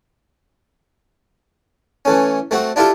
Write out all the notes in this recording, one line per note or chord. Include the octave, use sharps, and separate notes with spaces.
E3 A3 C#4
A3 C4 F#4
D4 E4 F4 G4 A4